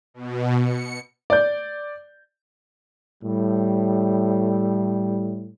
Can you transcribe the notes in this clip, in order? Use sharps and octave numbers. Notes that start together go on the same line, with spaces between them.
B2
C#7
D5 G6
A2 G3